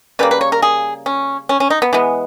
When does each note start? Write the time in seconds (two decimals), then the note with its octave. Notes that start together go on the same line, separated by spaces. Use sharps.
0.19 C#3 G3 A#3 B4
0.31 B4
0.41 C#5
0.52 A#4
0.62 G#4
1.06 C#4
1.49 C#4
1.60 C#4
1.70 D#4
1.82 B3
1.93 E3 G#3 B3